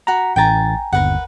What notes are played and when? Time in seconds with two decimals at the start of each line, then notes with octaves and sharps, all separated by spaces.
0.07 F#4 A#5 B5
0.36 A1 G5 G#5 A#5 A6
0.93 G1 D#2 A#4 B4 F#5